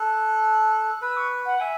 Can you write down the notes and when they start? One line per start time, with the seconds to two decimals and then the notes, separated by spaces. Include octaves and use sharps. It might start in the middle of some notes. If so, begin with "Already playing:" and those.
Already playing: A4 F#6
1.02 B4 E6
1.17 C#6
1.46 F#5
1.60 E5 G#5